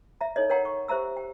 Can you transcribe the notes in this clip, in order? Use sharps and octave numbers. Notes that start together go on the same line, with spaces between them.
E5 A#5
D#4 A4 C#5 D#5
A#4 C#5 D#5 F#5 G5 A#5
C#6
G4 C5 E5 A#5 E6
G5